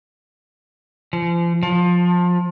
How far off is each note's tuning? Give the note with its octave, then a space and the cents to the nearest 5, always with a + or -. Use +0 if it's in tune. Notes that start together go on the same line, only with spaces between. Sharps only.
F3 -35
F3 +20